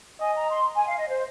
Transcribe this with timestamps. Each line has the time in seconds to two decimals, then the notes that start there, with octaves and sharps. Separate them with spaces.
0.20 D#5 G#5
0.35 A#5
0.50 C6
0.76 G#5
0.87 F5
0.98 D#5
1.09 C5